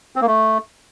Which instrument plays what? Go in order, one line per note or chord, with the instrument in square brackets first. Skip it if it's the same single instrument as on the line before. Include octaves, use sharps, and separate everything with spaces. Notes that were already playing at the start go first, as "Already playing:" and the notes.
[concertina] C4
A#3
A3